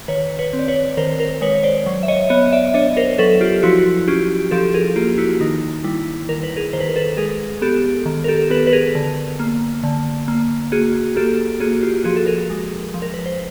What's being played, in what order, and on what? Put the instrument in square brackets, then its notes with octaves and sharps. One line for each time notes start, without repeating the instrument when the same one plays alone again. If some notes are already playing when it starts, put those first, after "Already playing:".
[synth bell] D#3 B4 C#5
B4 C#5
C4
D5
B4 C#5
D#3 A#4 C5
A#4 C5
G#3 B4 C#5
C#5
C5 D5
F#3
E5
C#5 D#5
B3 C#5 D#5
D5 E5
D4 C#5 D#5
A#4 C5
F#3 A4 B4
F4 G4
F3 E4 F#4
C#4 F4 G4
F3 G4 A4
G#4 A#4
A#3 F4 G4
E4 F#4
D#3 D#4
G3 E4
D#3 A#4
B4
G#4 A#4
D#3 C5
B4
A#4
A4 B4
G#3 G#4 A#4
B3 G4 A4
D#3
A#4
G4 A4
B3 A4 B4
B4
G#4 A#4
D3
A#3
D3
A#3
A#3 F#4 G#4
A#3 G4 A4
A#3 F#4 G#4
F4 G4
F3 F#4 G#4
A4
G#4 A#4
G#3
F3
A#4
B4
C5